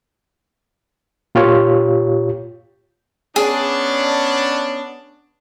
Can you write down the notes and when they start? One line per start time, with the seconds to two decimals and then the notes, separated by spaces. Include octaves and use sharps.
1.35 A#2 F4 G4 C#5
3.36 B3 C#4 D4 G#4